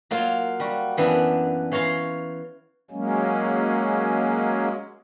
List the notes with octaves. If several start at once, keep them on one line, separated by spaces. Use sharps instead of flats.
F#3 A#3 F4
G3 F#4
F#2 E3 B3 D4
E3 C#5 F5 A#5 C6
F#3 G#3 A#3 C#4